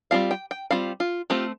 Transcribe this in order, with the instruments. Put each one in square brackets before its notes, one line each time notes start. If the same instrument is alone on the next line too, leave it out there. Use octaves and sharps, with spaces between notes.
[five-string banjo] G3 C4 F4 F5
G5
G5
G3 C4 F4 F5
F4
A3 C4 F4 G4